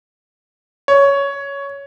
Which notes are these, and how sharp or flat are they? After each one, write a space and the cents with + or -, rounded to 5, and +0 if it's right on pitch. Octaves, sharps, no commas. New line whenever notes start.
C#5 +10